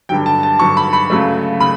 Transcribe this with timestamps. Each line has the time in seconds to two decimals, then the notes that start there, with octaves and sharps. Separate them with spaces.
0.09 G2 D3 F#3 G5
0.26 A5
0.43 A5
0.59 G2 D3 F#3 C#6
0.77 B5
0.93 B5
1.10 C#2 C#3 F#3 A3
1.60 C#3 B5